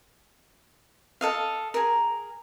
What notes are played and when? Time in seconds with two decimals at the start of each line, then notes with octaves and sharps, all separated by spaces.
1.21 A4 D#5 F5
1.74 G#4 A#4